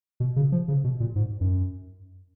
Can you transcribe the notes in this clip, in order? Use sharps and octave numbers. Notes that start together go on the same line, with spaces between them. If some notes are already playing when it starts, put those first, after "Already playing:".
B2
C#3
F3
C#3
B2
A#2
G#2
F#2